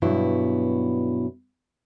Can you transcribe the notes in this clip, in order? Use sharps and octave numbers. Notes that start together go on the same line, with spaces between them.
G2 B2 F#3 B3 E4